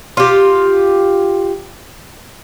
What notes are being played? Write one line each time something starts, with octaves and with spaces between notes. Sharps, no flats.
F4 G4